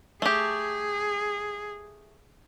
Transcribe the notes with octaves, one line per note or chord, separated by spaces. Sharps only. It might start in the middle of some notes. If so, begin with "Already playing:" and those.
A3 G4 G#4